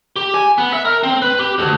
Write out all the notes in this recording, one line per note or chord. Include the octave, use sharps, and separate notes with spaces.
G4
G#5
B3
E5
A#4
C4
B4
G4
D2